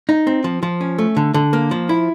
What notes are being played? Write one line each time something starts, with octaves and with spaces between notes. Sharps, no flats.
D#4
C4
F3
F3
C#4
A3
D3
D3
A#3
F3
E4